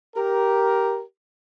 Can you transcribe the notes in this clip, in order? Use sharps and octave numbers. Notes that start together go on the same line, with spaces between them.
G4 A#4